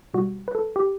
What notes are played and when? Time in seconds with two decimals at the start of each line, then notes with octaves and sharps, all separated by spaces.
0.14 B2 G3 F#4
0.48 B4
0.55 A4
0.76 G4